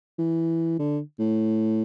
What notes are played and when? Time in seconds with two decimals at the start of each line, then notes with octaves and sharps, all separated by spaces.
0.18 E3
0.79 D3
1.19 A2